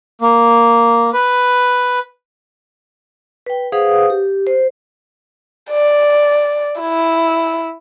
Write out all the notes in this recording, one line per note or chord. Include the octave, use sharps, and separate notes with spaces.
A#3
B4
B4 G5
G#4 B4 C5 F5 F#5 D#6
G4
C5
D5
E4